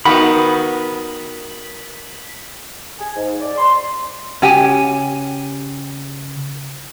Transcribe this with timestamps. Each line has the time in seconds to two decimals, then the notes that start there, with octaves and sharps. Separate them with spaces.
0.05 D#3 B3 F#4 B5
2.99 G#5
3.16 G#2
3.40 D5
3.58 C6
4.42 C#3 C#4 G4 G#5